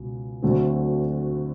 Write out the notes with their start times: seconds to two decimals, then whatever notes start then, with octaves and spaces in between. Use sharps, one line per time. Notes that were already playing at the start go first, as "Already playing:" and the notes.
Already playing: C#2 B2
0.42 D2 D3 F#3 A3 C4